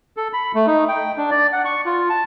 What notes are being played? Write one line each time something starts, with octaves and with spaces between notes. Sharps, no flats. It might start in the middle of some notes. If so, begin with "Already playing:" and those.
A4
B5
A3
D#4
G5
D4
D5
F#5
C#6
F4
A5